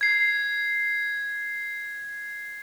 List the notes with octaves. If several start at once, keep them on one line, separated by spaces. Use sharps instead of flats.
G#6 C7